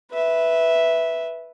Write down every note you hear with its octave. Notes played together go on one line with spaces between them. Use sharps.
B4 E5